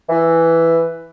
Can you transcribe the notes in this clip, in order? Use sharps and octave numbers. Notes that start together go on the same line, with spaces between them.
E3